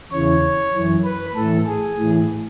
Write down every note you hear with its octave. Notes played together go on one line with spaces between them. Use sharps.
E2 C#3 E3 C#5
F#2 E3
B4
A2 E3 A4
G#4
A2 E3